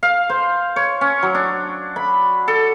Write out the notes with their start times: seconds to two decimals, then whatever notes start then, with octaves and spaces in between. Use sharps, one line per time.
0.03 F5
0.30 C5
0.76 C#5
1.01 C#4
1.22 F#3
1.34 D4
1.96 B5
2.48 A4